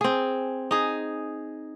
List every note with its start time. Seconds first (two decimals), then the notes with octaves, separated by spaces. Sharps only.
0.01 C4 G#4
0.71 D#4 G#4